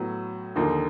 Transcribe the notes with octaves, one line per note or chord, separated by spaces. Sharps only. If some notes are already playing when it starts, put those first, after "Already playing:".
Already playing: A2 F#3 B3
D#2 D3 F3 A#3 D#4